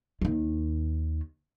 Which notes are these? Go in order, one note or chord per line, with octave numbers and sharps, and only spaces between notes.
D#2 D#3